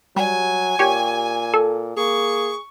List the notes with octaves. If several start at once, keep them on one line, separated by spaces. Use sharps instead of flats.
F#3 G3 G#5
A#2 G4 C#5
A4
A#3 G#4 C#6